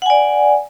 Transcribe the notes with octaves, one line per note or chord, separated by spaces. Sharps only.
D5 F#5 G#5